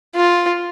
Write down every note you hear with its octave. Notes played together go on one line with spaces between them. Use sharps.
F4